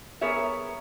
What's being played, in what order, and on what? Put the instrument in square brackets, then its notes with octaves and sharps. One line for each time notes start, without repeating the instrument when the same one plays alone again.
[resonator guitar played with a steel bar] B3 G#4 A#4 C#5 E5